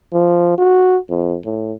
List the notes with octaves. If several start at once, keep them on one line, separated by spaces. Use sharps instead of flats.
F3
F#4
F2
A2